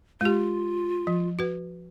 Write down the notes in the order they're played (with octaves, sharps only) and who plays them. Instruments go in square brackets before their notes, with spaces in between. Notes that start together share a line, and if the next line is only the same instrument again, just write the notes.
[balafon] G#3 G4 [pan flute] F4
[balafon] F3
F#4 B4